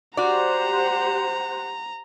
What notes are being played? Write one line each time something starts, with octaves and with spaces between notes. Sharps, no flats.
F#4 G4 C5 D5 F#5 A#5